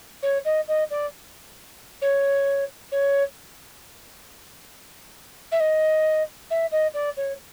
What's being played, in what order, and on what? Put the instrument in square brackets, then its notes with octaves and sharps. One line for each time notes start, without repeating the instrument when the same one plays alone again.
[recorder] C#5
D#5
D#5
D5
C#5
C#5
E5
D#5
E5
D#5
D5
C#5